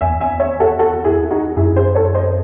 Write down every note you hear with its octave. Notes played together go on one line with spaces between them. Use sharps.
E2 E5 G#5
E5 G#5
C#5 E5
F#4 A4
F#4 A4
E4 G#4
D#4 F#4
F#2 E4 G#4
G#4 C5
A4 C#5
C5 D#5